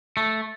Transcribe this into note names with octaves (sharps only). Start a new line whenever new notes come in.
A3